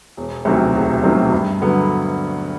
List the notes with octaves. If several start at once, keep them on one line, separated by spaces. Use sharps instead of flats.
E1
D2 C3 D#3 F#3
E1
D2 C3 D#3 F#3
G2
D3 F#3 B3